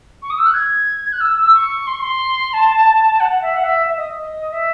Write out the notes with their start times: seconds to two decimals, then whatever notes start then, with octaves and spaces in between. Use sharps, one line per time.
0.22 C#6
0.30 D#6
0.38 E6
0.46 F#6
0.53 G#6
1.12 F#6
1.20 E6
1.53 C#6
1.87 C6
1.94 C#6
2.01 C6
2.53 A5
3.20 F#5
3.42 E5
3.54 F#5
3.64 E5
3.86 E5
3.96 D#5
4.18 D#5
4.52 E5